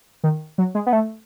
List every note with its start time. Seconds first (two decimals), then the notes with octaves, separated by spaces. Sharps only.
0.24 D#3
0.58 F#3
0.75 G#3
0.86 B3
0.93 A3